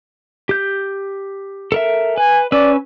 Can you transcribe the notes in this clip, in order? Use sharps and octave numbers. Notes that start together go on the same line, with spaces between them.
G4 G6
A4 A#4 E5
B4 G#5
C#4 B4 D5 E6